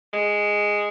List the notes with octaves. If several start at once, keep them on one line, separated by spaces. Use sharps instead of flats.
G#3